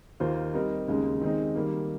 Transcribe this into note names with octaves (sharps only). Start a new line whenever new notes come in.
D#2 D#3 A#3 F4 C5
G3 C4 D#4 A#4
D#2 C#3 G#3
D#3 G#3 C4 D#4
D#3 G3 A#3